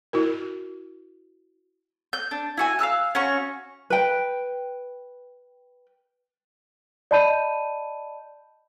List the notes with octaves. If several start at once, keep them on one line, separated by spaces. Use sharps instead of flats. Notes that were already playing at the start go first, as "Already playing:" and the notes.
E4 F#4 A#4
G6
D4
E4 F#4 G#5
F5 A5 E6 F#6
C#4 F#4 C#6
B4 G5
D5 D#5 A5 B5 G6 D#7